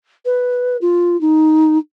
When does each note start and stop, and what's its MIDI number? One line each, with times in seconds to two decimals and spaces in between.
0.26 0.77 71
0.82 1.19 65
1.21 1.78 63